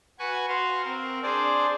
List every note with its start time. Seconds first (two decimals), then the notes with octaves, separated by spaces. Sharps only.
0.19 F#4 B4 G#5 C#6
0.48 F#4 F5 C6
0.84 C4 A#4
1.23 D4 G#4 C5 D5